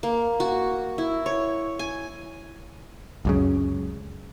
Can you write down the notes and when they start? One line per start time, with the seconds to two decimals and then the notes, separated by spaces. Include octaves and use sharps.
0.03 A#3
0.40 F#4
0.98 E4
1.26 C#5
1.79 G#5
3.25 C#2 F#2 C#3